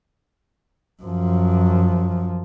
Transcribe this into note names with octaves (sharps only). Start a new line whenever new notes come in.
F#2 F3